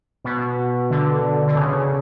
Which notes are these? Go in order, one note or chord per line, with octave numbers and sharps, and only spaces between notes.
B2
D3
D3
C#3